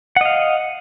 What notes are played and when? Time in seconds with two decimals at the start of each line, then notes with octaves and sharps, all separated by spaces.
0.16 F#5
0.21 D#5
0.25 F5